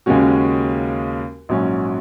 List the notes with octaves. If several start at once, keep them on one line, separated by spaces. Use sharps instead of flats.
D#2 C#3 G#3 C#4 F#4
A#1 G#2 F#3 C#4